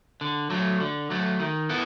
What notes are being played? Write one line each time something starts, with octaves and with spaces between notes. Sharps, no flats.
D3
F#3 A3
D3
F#3 A3
D#3
B3 E4 A4